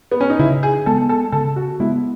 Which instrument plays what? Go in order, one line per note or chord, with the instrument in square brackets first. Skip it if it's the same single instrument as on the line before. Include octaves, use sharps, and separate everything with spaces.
[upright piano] B3
C#4
D#4
[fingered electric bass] C#3 [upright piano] E4
[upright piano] G#4
[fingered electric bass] G#3 B3 [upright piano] A4
[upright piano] A4
[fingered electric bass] C#3 [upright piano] A4
[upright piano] F#4
[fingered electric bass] G#3 B3 [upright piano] E4